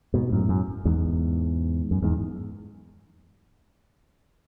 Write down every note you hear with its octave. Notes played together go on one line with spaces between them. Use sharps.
G#2 B2
F#2 A2
F#2
E2 G#2
F#2
E2 G#2